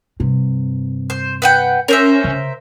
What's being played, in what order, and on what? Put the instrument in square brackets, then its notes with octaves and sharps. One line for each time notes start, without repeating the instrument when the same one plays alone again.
[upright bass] G2 C3
[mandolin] C5
B4 F#5 G5
[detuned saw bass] C#4 [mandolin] A#4 C5 E5
[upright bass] C#3